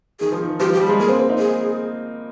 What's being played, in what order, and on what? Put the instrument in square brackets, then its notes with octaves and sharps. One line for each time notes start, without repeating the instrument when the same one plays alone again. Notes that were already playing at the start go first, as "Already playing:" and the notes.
[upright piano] D#3 [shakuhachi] G#4
[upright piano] F3
D#3
[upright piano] F3 [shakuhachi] G4
[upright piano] F3 [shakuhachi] G4
[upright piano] G3
[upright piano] G#3 [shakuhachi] G#4
[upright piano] A#3 [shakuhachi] G#4
[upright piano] C4
C4
D#4
[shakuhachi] G#4